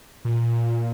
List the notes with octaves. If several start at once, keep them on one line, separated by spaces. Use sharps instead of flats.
A#2